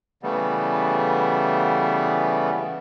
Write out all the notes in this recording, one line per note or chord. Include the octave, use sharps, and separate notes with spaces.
C#3 E3 G3 A3 B3